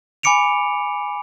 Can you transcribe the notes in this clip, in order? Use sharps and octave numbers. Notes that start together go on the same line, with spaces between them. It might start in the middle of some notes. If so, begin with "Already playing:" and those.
G#5 B5 D6 C#7 D7 F7